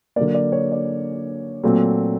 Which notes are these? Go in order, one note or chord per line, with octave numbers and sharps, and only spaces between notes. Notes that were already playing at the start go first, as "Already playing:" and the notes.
D3 F#3 A#3 D5
D5
C#5
D5
A#2 F#3 A3 C4